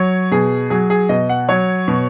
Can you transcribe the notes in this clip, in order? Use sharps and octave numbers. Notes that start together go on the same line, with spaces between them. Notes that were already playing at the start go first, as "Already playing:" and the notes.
Already playing: F#3 C#5
B2 G#4
F#3 G#4
G#4
B2 D#5
F#5
F#3 C#5
B2